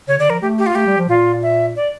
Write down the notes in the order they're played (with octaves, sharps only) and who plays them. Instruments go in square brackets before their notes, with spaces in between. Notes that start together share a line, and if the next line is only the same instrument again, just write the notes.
[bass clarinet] C#3 [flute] C#5
[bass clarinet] D3 [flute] D5
[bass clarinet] F3 [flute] A#4
[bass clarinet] A3 [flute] G4
[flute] G4
F4
[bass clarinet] A3 [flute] G4
[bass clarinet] G3
F3
[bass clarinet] A#2 [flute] F4
[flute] E5
D5